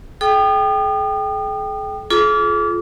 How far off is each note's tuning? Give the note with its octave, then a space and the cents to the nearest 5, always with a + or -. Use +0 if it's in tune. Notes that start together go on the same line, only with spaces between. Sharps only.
G#4 +45 G5 +0 D#6 -40
F4 +0 G#4 +45 D6 -30